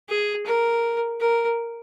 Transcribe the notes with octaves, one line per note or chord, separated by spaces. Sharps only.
G#4
A#4
A#4